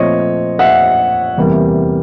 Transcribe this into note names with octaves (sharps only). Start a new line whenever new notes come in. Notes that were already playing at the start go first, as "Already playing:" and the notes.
Already playing: A#2 F3 A3 C4 C#5 D#5
E5 F#5
E2 C3 E3 G3 A#3